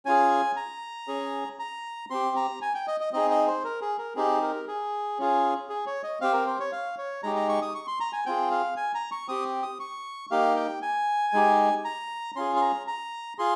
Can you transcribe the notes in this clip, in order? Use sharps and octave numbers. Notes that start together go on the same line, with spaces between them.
C#4 F4 G#4 G#5
A#5
C#4 G#4
A#5
C4 G4 C6
A#5
G#5
G5
D#5
D#5
C4 D#4 G#4 D#5
D#5
C5
A#4
G#4
A#4
C4 D#4 G4 G#4
A#4
G#4
C#4 F4 G#4
G#4
C#5
D#5
C4 G4 F5
A#4
C5
C#5
F5
C#5
G#3 D#4 G4 A#5
A#5
C#6
D#6
C#6
C6
A#5
G#5
C4 F4 G#4 G5
F5
G#5
A#5
C#6
C4 G4 D#6
D#6
C#6
A#3 D#4 G4 F5
G5
G#5
G#3 D#4 G4
A#5
C#4 F4 G#4 C6
C6
A#5
A#5
F4 G#4 C6